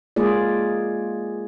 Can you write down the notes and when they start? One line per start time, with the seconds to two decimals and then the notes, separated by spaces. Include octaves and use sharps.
0.16 G#3 A#3 F4 G#4 D5